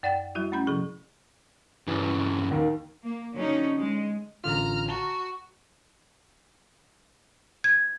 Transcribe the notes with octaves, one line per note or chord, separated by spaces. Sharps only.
F#2 D5 F#5 G5 A6
F#3 G3 E4 F#4
A3 C#4 B5 G6
C3 F3 G#4 C#6
G2 C#3 E3
D#2 D#3
A#3
D3 F#3 C#4 D#4
G#3
A1 D3 F4 A#5 F6
F#4 A5 A#5
G#6